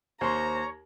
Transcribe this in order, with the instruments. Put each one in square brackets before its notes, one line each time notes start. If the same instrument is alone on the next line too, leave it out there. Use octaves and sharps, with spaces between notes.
[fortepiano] D#2 C6 C#6 [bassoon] C5 [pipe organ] C#5 [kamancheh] A#5